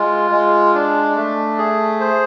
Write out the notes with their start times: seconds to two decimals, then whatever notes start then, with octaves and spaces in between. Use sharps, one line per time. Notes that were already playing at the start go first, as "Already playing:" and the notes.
Already playing: G#3 F4
0.31 G#3
0.74 D4
1.16 A3
1.58 G#4
2.00 C5